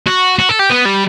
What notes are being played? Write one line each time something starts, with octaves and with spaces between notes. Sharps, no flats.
F#4
F#4
A4
G4
B3
G3